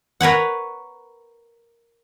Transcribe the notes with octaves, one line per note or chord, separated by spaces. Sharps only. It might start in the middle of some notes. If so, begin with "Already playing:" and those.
A#4 B4 C#5 F#5